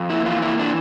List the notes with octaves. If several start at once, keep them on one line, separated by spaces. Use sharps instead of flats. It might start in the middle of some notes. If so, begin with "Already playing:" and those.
Already playing: F2
A#3 E4
E3 F4
A#3 E4
E3 D4